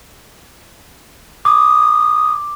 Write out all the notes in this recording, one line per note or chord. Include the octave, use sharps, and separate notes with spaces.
D6 D#6